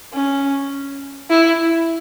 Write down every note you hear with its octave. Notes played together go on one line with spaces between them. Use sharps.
C#4
E4